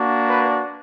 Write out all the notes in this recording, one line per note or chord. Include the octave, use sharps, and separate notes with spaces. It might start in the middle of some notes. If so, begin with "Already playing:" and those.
Already playing: A#3 D4 F#4
B4